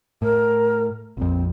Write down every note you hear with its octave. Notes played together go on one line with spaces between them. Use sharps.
A2 A#4
A#1 F2 C4